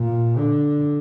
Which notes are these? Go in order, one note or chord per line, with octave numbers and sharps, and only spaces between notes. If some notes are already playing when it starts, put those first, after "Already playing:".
Already playing: A#2
D3